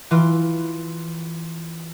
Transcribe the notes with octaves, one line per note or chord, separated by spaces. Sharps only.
E3 F4